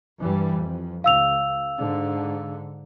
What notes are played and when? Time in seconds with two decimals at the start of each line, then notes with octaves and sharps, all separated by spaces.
0.18 G2 E3 G3
0.55 F2
1.04 C#2 F5 E6 F7
1.78 G#2 D3